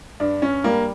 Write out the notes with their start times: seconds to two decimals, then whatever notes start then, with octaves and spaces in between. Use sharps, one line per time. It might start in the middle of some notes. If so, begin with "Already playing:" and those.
0.20 G2 D4
0.42 C#4
0.64 G3 A#3